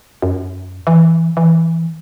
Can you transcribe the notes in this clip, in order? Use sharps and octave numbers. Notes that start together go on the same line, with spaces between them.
F#2
E3
E3